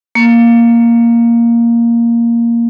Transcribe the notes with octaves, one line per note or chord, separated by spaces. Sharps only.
A#3